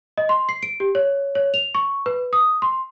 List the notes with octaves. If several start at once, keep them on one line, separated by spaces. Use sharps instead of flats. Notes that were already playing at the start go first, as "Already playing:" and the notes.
D#5
C6
C7
D7
G4
C#5
C#5
F7
C#6
B4
D#6
C6